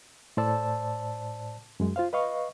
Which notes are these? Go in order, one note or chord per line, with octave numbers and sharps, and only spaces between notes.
A2 C5 D5 A5 E6
F#2 G#3
F4 C5 F5
B4 D#5 F5 C#6